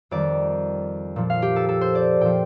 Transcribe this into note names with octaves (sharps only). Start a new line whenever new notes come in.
F2 D#3 G3 D5
A#2 F3
F5
G4
A4
A4
C5
D5
A#2 F3 G5